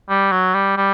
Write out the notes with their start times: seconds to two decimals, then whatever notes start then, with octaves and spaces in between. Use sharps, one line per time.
0.10 G3
0.32 F#3
0.55 G3
0.77 G3